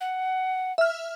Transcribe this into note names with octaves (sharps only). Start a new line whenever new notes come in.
F#5
E5 F6